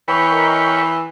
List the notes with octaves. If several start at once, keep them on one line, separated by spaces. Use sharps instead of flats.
E3 B4 C#5 G5
A#4 D#5